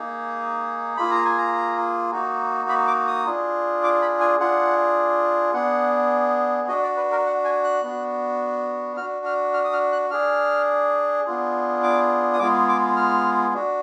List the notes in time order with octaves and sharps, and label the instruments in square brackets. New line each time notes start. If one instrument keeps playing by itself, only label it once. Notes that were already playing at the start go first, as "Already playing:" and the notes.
Already playing: [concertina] A#3 D#4 G#4
A#3 F4 G#4 B5
A#5
G#5
A#5
A#3 D#4 F#4
B5
D6
D#6
D4 F4 G#4
D6
B5
G#5
D4 F4 G#4 F#5
B3 D4 G#4 F#5
D4 F#4 D#5
D5
B4
A#4
F#5
G#5
F#6
B3 D4 F#4
F#4 F6
D4
F6
F6
D#6
F6
F#6
D4 G#4 F6
B3 D4 F4 G#4
D6
D#6
G#3 B3 F4 G#4 D6
D6
F6
D4 F#4